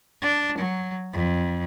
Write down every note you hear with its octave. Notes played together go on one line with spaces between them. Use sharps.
D4
F#3
F2